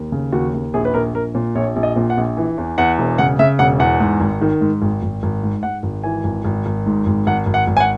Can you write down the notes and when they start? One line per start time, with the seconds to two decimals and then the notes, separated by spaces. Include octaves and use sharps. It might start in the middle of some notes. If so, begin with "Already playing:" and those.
Already playing: D#2
0.12 C#3
0.32 D#2 F#4
0.54 D#2
0.74 A#1 G#4
0.85 B4
0.94 A#1 A#4
1.14 A#1 A#4
1.35 A#2
1.55 A#1 C#5
1.76 A#1
1.83 D#5
1.96 A#2
2.10 F#5
2.17 A#1
2.37 E3
2.58 E2
2.78 E2 F#5
2.99 E1
3.18 C#3 F#5
3.39 C#3 E5
3.59 E1 F#5
3.80 E2 F#5
4.00 G#2
4.21 G#1
4.41 D#3
4.61 G#2
4.82 G#1
5.03 G#1
5.23 G#1
5.43 G#2
5.63 G#2 F#5
5.83 G#1
6.04 E3 G#5
6.24 G#1
6.45 G#1
6.66 G#1
6.86 G#2
7.06 G#1
7.27 G#1 F#5
7.46 G#1
7.54 F#5
7.67 G#1
7.77 G#5
7.80 F#5